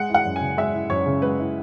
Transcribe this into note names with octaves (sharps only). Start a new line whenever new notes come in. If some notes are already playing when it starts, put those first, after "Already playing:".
Already playing: G#3 F#5
E4
F#5
F#2
G#5
C#3
G#3 E5
E4
F#2 C#5
C#3
G#3 B4
E4